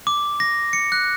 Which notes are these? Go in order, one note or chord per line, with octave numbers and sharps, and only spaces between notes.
D6
A#6
C#7
F#6